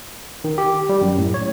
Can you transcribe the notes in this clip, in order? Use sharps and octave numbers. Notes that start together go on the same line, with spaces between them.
D#3
G4
G3
F#2
A2
C#5